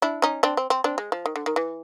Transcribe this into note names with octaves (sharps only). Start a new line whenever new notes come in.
D4 E4
C#4 D#4
C4 D4
C4
C4
C4 D4
G#3
F3
D#3
D3
D#3
E3